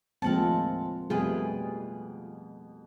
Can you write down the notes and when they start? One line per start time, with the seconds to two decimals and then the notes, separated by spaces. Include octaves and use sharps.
0.22 D#2 A2 F3 G#3 C4 A#4 F#5 A5
1.10 F2 B2 G3 A3 F4 G4 G#4 B4